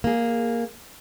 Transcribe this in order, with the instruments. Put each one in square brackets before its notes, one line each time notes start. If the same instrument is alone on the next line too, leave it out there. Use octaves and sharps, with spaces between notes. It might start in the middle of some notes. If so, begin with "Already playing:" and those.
[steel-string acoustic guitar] A#3 G#4